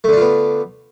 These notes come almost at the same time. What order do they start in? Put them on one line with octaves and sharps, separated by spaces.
A3 D3 D4 F4 B3